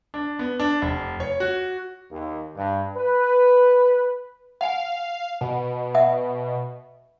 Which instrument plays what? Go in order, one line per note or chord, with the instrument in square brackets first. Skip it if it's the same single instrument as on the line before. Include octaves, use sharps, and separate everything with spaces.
[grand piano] D4
B3
D4
F1
C#5
F#4
[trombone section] D#2
G2
B4
[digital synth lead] F5 [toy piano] F#5 G#5
[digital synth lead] B2
[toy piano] E5 F#5 D#6